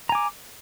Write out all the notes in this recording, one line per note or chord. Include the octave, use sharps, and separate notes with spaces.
G#5 A#5 D6